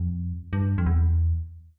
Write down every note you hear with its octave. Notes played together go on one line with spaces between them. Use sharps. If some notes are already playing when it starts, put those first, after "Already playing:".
Already playing: F2
G2
F2
E2